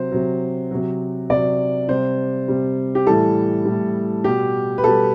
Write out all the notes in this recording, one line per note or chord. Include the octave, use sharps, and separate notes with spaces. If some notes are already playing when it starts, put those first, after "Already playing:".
Already playing: C3 F#3 C5
C3 F#3
C3 F#3
C3 F#3 D5
C3 G3 C5
C3 G3
G4
A2 E3 G3 A4
A2 E3 G3
B2 G3 G4
B4
B2 G3 A4